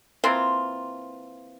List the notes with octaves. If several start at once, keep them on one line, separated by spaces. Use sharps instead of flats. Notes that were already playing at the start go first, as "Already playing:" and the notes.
E3 A#3 C4 F4